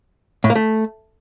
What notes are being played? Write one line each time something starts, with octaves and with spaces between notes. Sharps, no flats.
A2
A#3
A3